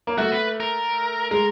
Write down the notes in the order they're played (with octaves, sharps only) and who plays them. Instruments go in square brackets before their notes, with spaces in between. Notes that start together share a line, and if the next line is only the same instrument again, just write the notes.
[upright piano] A#3
[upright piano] A3 [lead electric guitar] F#4
[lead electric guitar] B4
A#4
[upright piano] G#3 [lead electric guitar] A#4